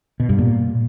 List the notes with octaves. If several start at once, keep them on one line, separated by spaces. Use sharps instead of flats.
B2
G2
A#2